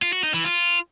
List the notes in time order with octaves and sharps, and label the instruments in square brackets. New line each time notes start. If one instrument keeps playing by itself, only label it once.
[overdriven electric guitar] F4
F#4
D#4
E3
F4